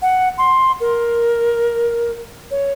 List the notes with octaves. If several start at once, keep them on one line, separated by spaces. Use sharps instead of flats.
F#5
C6
A#4
C#5